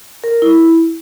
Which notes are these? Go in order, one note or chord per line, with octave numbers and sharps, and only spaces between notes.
A#4
E4